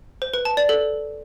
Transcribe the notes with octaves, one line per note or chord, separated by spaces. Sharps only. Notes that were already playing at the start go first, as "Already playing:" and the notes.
C5
B4
A5
D5
A4